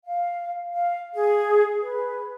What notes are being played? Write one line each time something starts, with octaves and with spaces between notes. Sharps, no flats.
F5
F5
G#4
B4